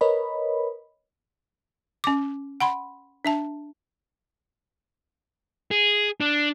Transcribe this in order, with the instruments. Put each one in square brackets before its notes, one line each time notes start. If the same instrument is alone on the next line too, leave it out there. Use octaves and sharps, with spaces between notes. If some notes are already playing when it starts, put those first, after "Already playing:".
[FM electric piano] A#4 B4 C#5 D#5 B5
[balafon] C#4 D6
F#5 B5 C6
D4 E5 A5
[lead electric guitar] G#4
D4